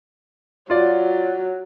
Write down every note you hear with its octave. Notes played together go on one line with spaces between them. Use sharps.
F#3 F4 D5